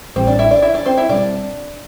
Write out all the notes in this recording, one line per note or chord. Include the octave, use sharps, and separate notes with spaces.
A1 A2 E3 G3 C4 C5
D4 D5
E4 E5
D4 D5
E4 E5
D4 D5
C4 C5
E4 E5
B2 G3 C4 D4 D5